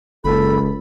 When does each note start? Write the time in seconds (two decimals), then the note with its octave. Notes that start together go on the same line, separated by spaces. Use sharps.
0.24 F#1 C#2 A4 B5